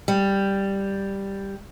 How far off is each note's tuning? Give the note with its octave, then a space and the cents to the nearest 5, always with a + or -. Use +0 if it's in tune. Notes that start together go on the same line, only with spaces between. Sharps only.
G3 +5